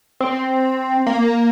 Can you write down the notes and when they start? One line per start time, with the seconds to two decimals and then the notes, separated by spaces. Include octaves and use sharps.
0.20 C4
1.06 A#3